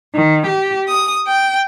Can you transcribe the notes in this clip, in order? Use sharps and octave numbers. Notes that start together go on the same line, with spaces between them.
D#3
G4
D#6
G5